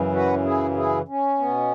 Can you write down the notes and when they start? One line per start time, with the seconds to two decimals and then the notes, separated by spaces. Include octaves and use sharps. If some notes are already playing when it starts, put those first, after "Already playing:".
Already playing: F#2 C#3 E3
0.12 F#4 B4
0.44 E4 G#4
0.76 E4 G#4
1.08 C#4
1.39 B2 B3